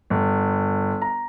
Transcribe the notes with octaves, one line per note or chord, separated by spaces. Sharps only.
G1
A#5